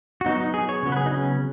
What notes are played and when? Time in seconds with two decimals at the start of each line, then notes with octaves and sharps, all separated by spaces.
0.21 F#4
0.26 F#3 B3 D#4
0.40 D#4
0.54 G#4
0.69 C#5
0.83 C#3 F#3 B3
0.92 B4
0.96 G#4
1.06 D#4
1.11 C#4